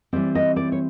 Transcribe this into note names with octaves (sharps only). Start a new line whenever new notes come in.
E3 G3 C4 D5
D#5
D5
C#5